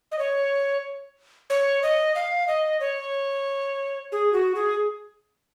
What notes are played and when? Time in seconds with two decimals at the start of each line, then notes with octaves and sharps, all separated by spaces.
0.12 D#5
0.19 C#5
1.50 C#5
1.83 D#5
2.15 F5
2.48 D#5
2.80 C#5
4.12 G#4
4.33 F#4
4.55 G#4